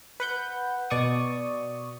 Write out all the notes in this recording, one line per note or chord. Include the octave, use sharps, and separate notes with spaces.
B4 F#5 G6
B2 D5 C#6 D#6